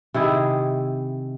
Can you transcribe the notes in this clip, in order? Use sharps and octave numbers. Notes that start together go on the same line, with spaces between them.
C3 D#3 E4 G#4